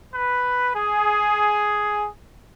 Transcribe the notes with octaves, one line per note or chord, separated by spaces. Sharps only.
B4
G#4